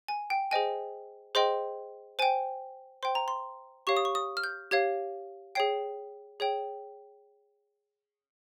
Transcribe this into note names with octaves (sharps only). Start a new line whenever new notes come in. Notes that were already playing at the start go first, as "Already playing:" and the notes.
G#5
G5
G#4 C5 D#5 G5 G#5
G#4 C5 D#5 G5 C6
C5 G5 G#5
C5 G5 C6
A#5
C6
G4 C#5 F5 C#6
D#6
C#6
D#6
F6
G6
G4 C#5 F5 G#6
G#4 C#5 G5 C7
G#4 C#5 G5